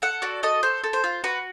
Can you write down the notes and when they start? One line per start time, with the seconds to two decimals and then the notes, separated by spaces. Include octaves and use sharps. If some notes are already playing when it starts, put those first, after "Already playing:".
0.02 A4 F#5
0.22 F#4 D5
0.43 A4 D#5
0.63 A4 C5
0.84 A4
0.93 C5
1.04 F4
1.24 F#4 B4